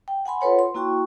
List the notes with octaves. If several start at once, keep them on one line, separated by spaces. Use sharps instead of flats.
G5
F#5 G#5 B5 C6
F4 A4 B4 C#5 F#5
C6
A#3 E4 F#4 G5 C#6